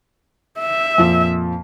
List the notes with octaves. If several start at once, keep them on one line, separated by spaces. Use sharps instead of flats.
E5
F2 A#2 F3